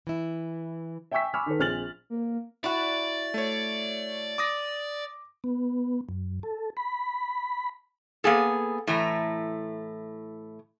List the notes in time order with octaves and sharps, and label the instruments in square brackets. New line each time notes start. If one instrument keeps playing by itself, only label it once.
[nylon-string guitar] E3 E4
[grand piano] E5 G5 G#5 C#6 E6 B6
G#5 B5 C#6 D6 E6 F6
D#3 A4 B4
A#1 C4 G#4 F6 A6 F#7
[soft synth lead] A#3
[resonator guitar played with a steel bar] E4 F#4 [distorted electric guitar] D5
[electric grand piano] A3 C#5
D6 D#6 A#6
[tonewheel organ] B3
F#2
A4
B5
[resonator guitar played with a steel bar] A#3 B3 G#4 A4
A2 E3 A3 A#5